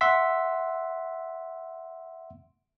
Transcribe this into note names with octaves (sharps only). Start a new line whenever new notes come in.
E5 F#5 C6 E6 B6